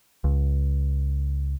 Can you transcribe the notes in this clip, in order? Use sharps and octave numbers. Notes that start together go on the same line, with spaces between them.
C#2